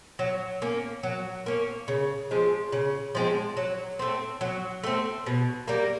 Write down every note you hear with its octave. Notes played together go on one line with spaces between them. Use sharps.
F#3
A#3 C#4
F#3
A#3 C#4
C#3
F3 G#3 C4
C#3
F3 G#3 C4
F#3
A3 C4
F#3
A3 C4
B2
G3 A#3